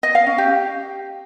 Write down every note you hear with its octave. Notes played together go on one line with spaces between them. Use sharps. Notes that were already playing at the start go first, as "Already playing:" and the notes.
D#5
F5
C#4
G4